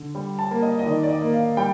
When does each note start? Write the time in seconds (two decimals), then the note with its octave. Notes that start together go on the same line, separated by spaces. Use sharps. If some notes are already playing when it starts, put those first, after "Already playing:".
Already playing: D3
0.15 G3
0.39 A5
0.51 A#3
0.62 D#5
0.79 D#5
0.86 D#3 D5
1.03 D5
1.09 D#5
1.21 A#3
1.34 F5
1.57 G3 G5